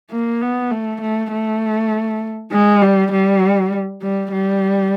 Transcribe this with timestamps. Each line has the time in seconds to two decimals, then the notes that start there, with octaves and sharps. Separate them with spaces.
0.11 A#3
0.42 B3
0.71 A3
1.02 A3
1.32 A3
2.52 G#3
2.82 G3
3.12 G3
4.02 G3
4.32 G3